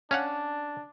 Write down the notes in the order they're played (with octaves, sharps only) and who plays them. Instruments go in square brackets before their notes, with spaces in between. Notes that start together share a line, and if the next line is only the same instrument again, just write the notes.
[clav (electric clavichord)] C#4 F5 F#5 [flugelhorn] D4